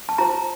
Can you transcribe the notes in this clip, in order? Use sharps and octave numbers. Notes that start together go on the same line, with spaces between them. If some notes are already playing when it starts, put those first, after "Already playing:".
A5
F4 C5 A#5